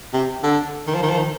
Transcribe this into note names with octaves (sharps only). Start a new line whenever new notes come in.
C3
D3
D#3
F3
D#3
F3
D#3